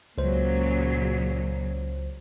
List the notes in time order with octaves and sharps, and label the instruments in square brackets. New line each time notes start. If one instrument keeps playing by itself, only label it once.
[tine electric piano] C#2 C5 [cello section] A#2 C#3 F#3